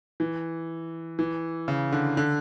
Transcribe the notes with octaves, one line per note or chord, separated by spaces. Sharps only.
E3
E3
C#3
D3
D3